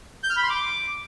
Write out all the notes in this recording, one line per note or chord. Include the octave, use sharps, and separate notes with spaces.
G6
F6
B5
C6
D6